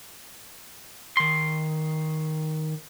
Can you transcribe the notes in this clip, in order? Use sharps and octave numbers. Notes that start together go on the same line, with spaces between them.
D#3 C6